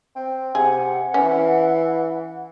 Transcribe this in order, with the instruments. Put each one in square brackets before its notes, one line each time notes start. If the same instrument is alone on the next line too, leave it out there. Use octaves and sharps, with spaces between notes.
[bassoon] C4
[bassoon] C3 [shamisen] G#4 [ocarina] F#5
[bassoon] E3 [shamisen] C#4